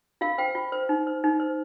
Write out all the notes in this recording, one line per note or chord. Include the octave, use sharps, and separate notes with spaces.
F4 F5
C5 G5
F4
C5
D#4
C5
D#4
C5